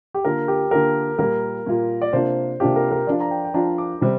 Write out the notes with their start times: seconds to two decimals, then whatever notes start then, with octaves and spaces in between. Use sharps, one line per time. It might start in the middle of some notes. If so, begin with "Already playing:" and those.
0.14 G4
0.25 D3 A#3 F4 A#4
0.48 G4
0.71 D3 A#3 F4 A#4
1.19 A#2 G3 A#3 F4 A#4
1.66 A#2 G3 A#3 F4
2.02 D5
2.13 C3 A#3 D4 F4 C5
2.60 C3 A#3 D4 F4 G4
2.76 A#4
2.91 A#4
3.07 F3 D4 F4 D5
3.20 A#5
3.31 G5
3.44 G5
3.54 F3 D4 F4 A#5
3.78 D6
4.01 C3 G3 C4